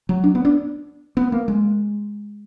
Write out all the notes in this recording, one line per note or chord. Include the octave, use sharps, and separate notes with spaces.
F#3
D4
B3
D4
B3
A#3
G#3